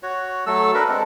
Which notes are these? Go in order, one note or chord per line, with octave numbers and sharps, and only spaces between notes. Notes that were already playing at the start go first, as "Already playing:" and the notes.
F#4 C#5
F#3 A3 A4 E6
D4 A#4 B4
G#3 C4 D4 A4